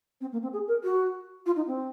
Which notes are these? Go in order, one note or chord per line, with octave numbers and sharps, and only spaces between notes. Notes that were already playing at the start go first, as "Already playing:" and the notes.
C4
A#3
C4
G#4
A#4
F#4
F4
D#4
C4